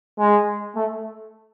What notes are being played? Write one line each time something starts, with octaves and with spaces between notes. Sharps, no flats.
G#3
A3